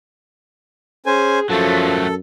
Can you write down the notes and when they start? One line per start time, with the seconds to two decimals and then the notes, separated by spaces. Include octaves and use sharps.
1.06 C#4 G#4 C5 G#5
1.50 F#2 F3 F#3 A3 A4